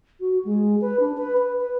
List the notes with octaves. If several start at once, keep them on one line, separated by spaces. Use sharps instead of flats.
F#4
G#3
B4
D4
B4
B4
B4